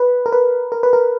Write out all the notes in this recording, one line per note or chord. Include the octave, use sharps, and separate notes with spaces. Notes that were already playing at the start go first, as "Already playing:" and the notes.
Already playing: B4
A#4
B4
A#4
B4
A#4